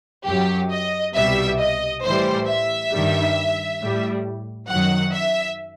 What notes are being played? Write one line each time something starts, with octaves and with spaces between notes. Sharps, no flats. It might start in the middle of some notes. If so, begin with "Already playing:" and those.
F#2 F#3 G4
D#5
C2 B2 G3 E5
D#5
A2 E3 G3 C5
E5
G2 D#3 G3
A2 G3
F#2 D#3 F#3 F#5
E5